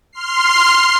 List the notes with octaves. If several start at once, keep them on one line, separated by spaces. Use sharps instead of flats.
C6 F6 C7